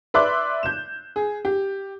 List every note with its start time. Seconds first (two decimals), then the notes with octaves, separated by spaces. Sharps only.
0.14 B4 D5 E5 C6 D6 F#6
0.63 G6 E7
1.16 G#4
1.45 G4